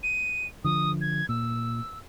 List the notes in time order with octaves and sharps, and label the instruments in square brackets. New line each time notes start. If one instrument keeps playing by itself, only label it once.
[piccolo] D#7
[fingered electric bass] D3 F3 [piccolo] D#6
[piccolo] G#6
[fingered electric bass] A#2 [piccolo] E6